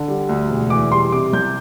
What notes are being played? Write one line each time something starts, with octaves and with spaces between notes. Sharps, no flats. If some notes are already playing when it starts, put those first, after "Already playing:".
Already playing: D3
G3
D2
E1
E3 D6
G3 C6
C3 D6
C2 G6